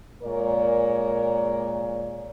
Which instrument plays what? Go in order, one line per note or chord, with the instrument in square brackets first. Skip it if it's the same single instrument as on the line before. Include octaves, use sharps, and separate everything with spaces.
[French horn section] A#2 G#3 A#4 C#5 D5